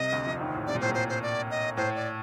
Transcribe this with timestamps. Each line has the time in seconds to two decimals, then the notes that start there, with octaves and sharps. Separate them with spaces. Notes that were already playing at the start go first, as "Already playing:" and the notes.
Already playing: C2 C3 D#5
0.12 D2 D3
0.26 F2 F3
0.41 D#2 D#3
0.54 A2
0.67 C3 D5
0.75 A#2
0.81 A2 C5
0.89 A#2
0.94 C5
1.09 C5
1.23 D5
1.51 D#5
1.77 A2 C5
1.95 D5